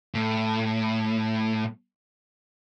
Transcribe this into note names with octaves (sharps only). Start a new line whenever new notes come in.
A2